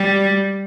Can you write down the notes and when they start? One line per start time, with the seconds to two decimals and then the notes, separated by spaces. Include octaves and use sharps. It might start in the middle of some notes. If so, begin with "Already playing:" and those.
Already playing: G3